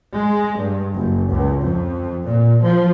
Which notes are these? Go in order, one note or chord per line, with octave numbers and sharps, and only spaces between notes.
G#3
G2
F#1
C#2
F2
A#2
F3